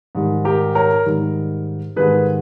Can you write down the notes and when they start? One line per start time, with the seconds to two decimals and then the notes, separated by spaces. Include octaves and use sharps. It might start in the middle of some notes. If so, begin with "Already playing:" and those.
0.15 G#2 D#3 G3
0.45 G4 A#4
0.75 A#4 C#5
1.06 G#2 D#3 G3
1.96 G#2 D#3 G3 G#4 B4